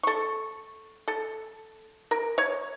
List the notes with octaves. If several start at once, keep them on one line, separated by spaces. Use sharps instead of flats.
A4 C#6
A4
A#4
C#5